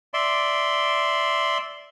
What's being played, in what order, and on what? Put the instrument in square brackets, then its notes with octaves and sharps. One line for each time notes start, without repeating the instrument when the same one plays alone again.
[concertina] D5 E5 C6